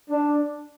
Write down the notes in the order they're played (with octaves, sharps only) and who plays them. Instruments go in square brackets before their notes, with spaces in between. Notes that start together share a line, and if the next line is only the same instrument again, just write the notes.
[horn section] D4